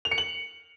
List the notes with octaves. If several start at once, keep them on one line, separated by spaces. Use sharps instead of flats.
F7
C#7
F#7